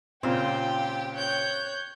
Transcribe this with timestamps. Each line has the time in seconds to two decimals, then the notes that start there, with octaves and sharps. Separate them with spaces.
0.23 A#2 C#3 C4 F4 G4 G5
1.14 C#5 F#6 G6